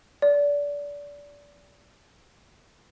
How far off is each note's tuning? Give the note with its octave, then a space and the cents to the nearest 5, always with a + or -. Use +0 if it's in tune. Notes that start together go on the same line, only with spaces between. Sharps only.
D5 -25